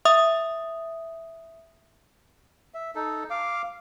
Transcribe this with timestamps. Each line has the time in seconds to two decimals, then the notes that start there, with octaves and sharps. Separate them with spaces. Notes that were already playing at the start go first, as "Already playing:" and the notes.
0.05 E5 D#6
2.74 E5
2.95 D#4 A4
3.30 F5 D6